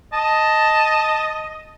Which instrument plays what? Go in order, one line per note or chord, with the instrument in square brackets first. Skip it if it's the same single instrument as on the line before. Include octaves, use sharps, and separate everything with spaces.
[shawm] D#5 [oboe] A5